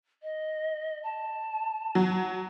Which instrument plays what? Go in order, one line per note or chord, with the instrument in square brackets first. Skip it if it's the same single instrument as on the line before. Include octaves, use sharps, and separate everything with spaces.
[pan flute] D#5
A5
[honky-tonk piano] F#3